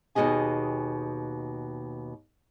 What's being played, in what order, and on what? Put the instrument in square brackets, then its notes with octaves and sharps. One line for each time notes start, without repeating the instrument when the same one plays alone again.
[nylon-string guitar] D#2 G#2 B2 G#4 D#5 G#5